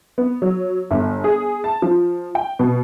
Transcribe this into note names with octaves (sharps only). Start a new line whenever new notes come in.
B3
F#3
G1
G#4
A5
F3
G5
B2